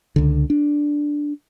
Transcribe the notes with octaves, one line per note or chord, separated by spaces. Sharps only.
C#2 D3
D4